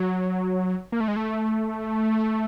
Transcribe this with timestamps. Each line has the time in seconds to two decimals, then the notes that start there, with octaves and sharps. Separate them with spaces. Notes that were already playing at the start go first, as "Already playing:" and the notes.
Already playing: F#3
0.92 A#3
1.00 A3
1.08 G#3
1.16 A3